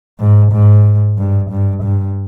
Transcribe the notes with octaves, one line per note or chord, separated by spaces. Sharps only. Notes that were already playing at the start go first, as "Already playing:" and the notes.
G#2
G#2
G2
G2
G2